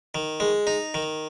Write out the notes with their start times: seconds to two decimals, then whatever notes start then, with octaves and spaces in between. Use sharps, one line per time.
0.15 D#3
0.40 G#3
0.67 D#4
0.94 D#3